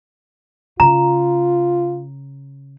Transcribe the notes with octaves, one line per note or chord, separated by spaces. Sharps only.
C#3 F4 A#5